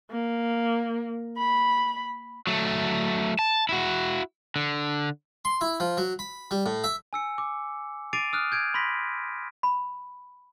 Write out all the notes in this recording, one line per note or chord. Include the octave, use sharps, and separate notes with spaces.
A#3
B5
F#3 A3
A5
E4 F#4
D3
C6
E4
F3
F#3
B5
G3
A2
E5
G#5 E6 C#7
D6
D6 A6 C7 D7 D#7 F7
D#6 F6 F#6
G6 G#6 D7
B5 C6 A#6 B6
B5